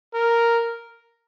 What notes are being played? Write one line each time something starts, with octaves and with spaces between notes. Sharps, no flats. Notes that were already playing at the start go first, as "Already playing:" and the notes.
A#4